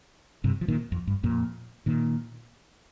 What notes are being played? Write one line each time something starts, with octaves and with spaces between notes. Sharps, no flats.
G2 C3
F3
A#2 D#3
F2
G2
F2 A#2
A#2 D#3